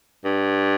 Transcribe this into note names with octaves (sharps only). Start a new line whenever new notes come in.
G2